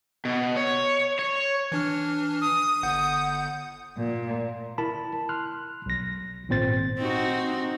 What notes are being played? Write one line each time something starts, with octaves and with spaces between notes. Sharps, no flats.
B2
C#5
C#5
E3 D4 F6
D#6
G1 F#5 G6
A#2
E4 A#4 A5 B5
C6 F6 F#6
B1 A#6
G#1 A#2 C4 C5 A6
C4 D#4 F#4